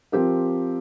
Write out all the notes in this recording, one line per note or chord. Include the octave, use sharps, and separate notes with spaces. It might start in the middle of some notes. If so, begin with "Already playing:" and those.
F3 C4 G4 A#4